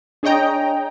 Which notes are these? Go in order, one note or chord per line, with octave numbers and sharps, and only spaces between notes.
D4 G#4 C#5 D#5 G5 A#5